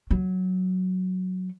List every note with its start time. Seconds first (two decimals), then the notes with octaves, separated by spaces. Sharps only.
0.11 F#3